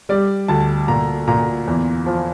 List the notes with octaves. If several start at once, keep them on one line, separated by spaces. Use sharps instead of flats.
G3 D5
D2 A5
A#2 A#5
A#2 A#5
E2
F3